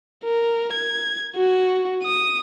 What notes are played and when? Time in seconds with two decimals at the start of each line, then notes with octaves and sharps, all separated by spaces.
0.25 A#4
0.73 G#6
1.36 F#4
2.03 D#6